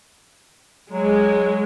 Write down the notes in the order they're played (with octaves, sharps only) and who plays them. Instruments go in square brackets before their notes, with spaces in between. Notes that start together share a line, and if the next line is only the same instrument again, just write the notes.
[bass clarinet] F#3 [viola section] G#3